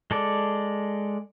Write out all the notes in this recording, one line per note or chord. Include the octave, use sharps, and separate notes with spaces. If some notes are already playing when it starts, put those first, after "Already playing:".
G#3 A4 D5